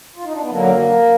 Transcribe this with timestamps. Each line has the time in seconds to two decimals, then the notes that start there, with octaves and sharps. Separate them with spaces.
0.16 F4
0.24 D#4
0.33 D4
0.42 B3
0.50 F#2 D3 F#3 A#3